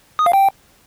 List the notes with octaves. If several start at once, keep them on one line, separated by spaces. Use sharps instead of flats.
D#6
F5
G5